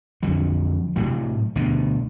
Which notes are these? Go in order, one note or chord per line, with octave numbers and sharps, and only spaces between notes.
F2 D3 F#3
A2 C3 F#3
D2 B2 D3